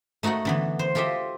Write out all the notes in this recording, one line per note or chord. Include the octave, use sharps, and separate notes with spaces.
A3 D#4 F#4 A4 F#5
D3 E3 B3
C5
F4 G4 A4 D#5 E5